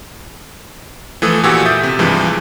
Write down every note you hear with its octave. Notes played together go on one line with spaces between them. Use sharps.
E3 F3 A3 A4 D#6
E2 A#2 E3 F#4 G4 E6
E5 D#6 G6 A6
C3
G2 C3 E3 F3 G#3